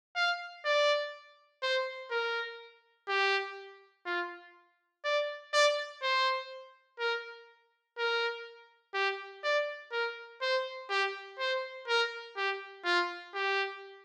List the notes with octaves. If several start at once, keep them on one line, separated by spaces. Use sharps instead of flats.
F5
D5
C5
A#4
G4
F4
D5
D5
C5
A#4
A#4
G4
D5
A#4
C5
G4
C5
A#4
G4
F4
G4